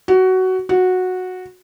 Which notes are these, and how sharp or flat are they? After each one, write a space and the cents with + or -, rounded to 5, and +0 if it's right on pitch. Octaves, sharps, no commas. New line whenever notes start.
F#4 +15
F#4 -10